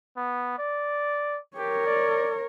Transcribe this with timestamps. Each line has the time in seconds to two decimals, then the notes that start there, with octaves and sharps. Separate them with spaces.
0.17 B3
0.58 D5
1.57 G4 A#4 C#5
1.86 D5